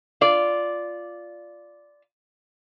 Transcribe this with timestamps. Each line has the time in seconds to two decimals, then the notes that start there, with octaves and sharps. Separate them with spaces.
0.21 F4 D5